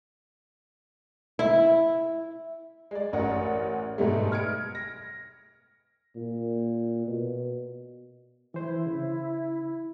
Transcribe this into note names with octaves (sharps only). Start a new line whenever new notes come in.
E4
G#3 D5
A1 C#4 A#4 D5 F#5
G#2 B2 G3 A3
F6 G#6 C#7 D7
A#6
A#2
B2
E3 E4 C5
C#3